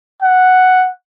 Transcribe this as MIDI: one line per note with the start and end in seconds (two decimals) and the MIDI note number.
0.22 0.89 78